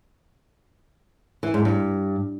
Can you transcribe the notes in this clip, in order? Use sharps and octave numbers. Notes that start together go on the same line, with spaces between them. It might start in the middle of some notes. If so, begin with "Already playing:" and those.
E3
G#2
G2